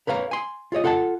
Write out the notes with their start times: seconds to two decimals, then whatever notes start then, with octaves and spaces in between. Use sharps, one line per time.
0.07 A#4 B4 C#5 F5 A#5
0.31 G#5 C6
0.72 F4 G#4 C#5 D#5
0.84 F4 A4 F#5 G#5 A5